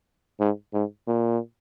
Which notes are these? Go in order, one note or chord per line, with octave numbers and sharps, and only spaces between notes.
G#2
G#2
A#2